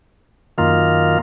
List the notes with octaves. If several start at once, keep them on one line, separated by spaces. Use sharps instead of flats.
F#2 D#3 A#3 F4